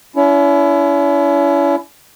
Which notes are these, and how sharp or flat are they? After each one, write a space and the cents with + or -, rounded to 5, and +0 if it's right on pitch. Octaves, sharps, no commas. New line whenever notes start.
C#4 +40 E4 +20